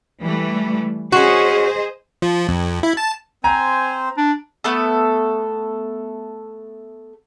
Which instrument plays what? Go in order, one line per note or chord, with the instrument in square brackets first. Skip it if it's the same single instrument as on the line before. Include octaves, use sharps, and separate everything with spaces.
[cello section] E3 G3 A3
[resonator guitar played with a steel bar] C#4 F#4 [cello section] G#4 C5 D#5
[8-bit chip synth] F3
F2
E4
A5
[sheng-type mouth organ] C4 C5 [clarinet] G#5 [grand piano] A#5
[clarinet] D4
[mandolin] A3 B3 A4